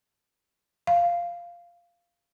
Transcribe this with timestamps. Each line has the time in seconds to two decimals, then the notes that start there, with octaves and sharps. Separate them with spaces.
0.87 F5